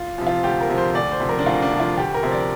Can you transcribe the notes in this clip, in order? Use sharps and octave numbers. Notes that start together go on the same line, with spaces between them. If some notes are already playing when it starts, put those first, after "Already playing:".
Already playing: F4
C3 F3
F4
D2 G4
A#4
C3 F3
C5
D2 D5
C5
C3 F3
A#4
D4
D2 F4
D4
C3 F3
F4
D2 G4
A#4
C3 F3
D5